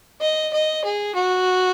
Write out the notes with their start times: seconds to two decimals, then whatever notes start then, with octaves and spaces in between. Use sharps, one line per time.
0.21 D#5
0.53 D#5
0.84 G#4
1.15 F#4